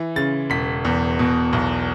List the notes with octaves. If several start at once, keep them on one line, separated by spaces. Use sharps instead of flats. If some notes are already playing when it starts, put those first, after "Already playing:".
Already playing: E3
C#3 A6
E1 B6
E2
B2
B1